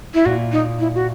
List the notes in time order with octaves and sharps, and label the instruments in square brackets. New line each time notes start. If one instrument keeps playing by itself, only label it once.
[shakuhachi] E4
[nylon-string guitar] A#2 [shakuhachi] F#4
[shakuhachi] D#4
E4
F#4